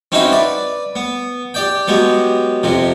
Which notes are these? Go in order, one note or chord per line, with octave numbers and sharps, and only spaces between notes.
C4 C#4 D#4 E4 F#4 B4
B4 D5
B3
G4 D5 G5
F#3 G#3 B3 G4
F2 C3 F3